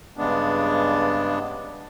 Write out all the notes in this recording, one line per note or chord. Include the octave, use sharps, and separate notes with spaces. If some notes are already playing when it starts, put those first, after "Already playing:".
G2 C#3 G#3 B3 D4